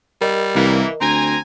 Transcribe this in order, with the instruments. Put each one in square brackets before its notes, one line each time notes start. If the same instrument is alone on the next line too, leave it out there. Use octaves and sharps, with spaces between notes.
[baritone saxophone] G3 [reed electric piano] A#4 D#5
[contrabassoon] C2 [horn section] E3 A#3
[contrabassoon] D2 [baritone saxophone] C4 [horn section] G#5 A#5